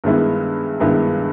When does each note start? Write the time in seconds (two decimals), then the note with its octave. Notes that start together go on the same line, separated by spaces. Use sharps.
0.04 G2 D#3 G#3 B3 E4
0.80 G2 D#3 G#3 B3 E4